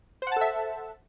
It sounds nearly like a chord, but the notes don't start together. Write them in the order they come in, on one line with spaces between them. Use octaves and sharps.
C5 F#5 A5 A4 E5